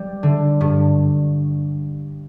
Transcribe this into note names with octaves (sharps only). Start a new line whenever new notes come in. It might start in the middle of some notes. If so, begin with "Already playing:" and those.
Already playing: G3
D3
G2